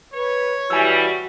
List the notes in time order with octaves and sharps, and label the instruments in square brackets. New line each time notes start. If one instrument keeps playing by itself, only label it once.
[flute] B4 [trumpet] C#5
[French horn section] E3 G3 [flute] F#4 [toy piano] G#5 E6